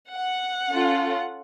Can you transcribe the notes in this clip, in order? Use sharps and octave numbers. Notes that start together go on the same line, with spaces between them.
F#5
C#4 F4 A4